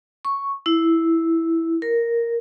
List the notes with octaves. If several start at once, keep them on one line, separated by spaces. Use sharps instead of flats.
C#6
E4
A#4